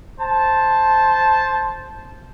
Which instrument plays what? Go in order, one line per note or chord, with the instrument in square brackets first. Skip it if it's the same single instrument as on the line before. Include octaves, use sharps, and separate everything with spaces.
[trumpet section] C5 A5